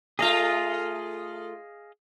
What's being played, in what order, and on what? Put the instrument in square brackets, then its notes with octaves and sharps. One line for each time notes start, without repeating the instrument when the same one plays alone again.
[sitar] A3 F4 [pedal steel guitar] G#4 D#5 F5